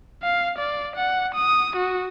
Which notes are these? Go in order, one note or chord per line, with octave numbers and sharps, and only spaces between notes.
F5
D5
F#5
D#6
F#4